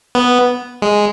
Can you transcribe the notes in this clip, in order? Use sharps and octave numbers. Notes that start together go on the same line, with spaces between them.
B3
G#3